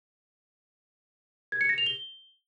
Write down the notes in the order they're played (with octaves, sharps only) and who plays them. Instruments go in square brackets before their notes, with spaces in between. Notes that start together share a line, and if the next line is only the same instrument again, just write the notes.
[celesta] G#6
C#7
A#6
F7
G7